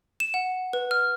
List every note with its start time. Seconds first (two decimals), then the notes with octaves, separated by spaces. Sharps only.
0.20 E7
0.34 F#5
0.73 B4
0.91 F6